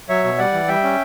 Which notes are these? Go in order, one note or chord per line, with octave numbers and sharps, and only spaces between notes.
F#3 C#5 E5
B2
G3 D5 F#5
E3
G3 E5 G5
C#4